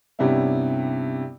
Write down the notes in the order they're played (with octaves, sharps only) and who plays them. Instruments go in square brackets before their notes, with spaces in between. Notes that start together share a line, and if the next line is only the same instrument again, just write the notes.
[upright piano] G2 C3 G3 B3 C#4 E4